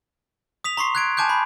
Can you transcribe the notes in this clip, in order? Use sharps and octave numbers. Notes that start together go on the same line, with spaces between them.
D#6 B6 F7
A#5 C6 C#6 C7
F#6 G#6 D7
G#5 A5 D6 F#6 G6
B5